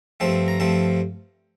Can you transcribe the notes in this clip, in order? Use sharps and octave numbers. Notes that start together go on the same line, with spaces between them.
G2 F3 A3 C4 A5
A#5
G2 F3 A3 C4 A5